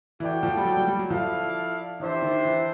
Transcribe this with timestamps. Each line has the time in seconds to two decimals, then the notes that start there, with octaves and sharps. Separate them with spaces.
0.20 E3 F#4 A4 D5 G5
0.43 F3
0.57 G3
0.65 F#3
0.77 G3
0.88 G3
0.99 F#3
1.10 F3 E4 A4 D5 F5
2.00 E3 D4 G4 C5 E5
2.22 D#3
2.45 E3